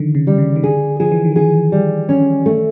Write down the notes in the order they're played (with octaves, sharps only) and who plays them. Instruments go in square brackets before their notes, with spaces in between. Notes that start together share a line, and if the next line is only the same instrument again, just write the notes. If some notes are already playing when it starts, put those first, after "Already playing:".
Already playing: [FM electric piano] D3 D#3 F3
C#3
[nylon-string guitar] G3
[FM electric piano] C#3
D#3
[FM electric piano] D3 [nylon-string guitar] G#4
[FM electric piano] F3 [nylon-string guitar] G#4
[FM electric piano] E3
D#3
[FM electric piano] E3 [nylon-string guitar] G#4
[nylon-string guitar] G3
C#4
A3